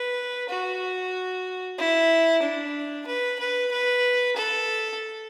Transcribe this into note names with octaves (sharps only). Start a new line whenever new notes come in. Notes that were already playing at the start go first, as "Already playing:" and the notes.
Already playing: B4
F#4
E4
D4
B4
B4
B4
A4